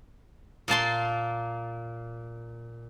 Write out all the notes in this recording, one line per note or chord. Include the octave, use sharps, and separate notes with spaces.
A#2 A#3 A5 C6